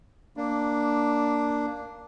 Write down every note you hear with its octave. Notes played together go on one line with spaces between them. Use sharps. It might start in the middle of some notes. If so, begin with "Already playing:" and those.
A#3 D4